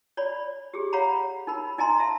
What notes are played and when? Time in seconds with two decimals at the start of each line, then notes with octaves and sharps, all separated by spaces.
0.17 C#5 D5 B5
0.74 G4 G#4
0.93 C#5 F5 F#5 A#5 B5
1.47 D#4 A#4 B5
1.78 D#4 D#5 G#5 A#5 C6
1.99 E5 F5 A5